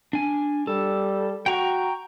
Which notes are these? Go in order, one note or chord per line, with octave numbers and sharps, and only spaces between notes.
D4 G#5
G3 A4
F#4 G5 A#5 C#6